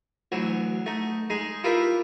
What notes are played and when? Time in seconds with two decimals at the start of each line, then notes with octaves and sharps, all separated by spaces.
0.32 D2 E3 F#3
0.86 A3 D#4
1.30 G#3 D#4 G#4
1.64 E4 F4 G4 A#4 B4 E5